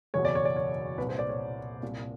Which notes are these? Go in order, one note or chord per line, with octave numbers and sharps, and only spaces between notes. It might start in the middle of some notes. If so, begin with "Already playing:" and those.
F#1 E2 B2 C#5
D5
C#5
D5
C#5
C2 A#2 B4
C5
D5
C#5
C2 A#2